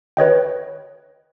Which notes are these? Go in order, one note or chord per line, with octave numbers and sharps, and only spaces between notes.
B4 C#5 D#5 G5